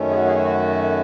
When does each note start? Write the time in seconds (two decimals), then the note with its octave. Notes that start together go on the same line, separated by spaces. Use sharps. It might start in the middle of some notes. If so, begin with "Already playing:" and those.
Already playing: F#2 D#3 A3 C#4
0.09 G#4
0.14 F#4
0.25 G#4
0.35 F#4